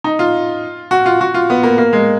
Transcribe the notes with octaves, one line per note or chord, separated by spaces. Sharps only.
D#4
F4
F#4
F4
F#4
F4
B3
A#3
A#3
G#3